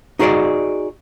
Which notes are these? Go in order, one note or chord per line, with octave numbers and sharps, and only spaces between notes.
D#4 F#4 G#4 B4 D5 D#5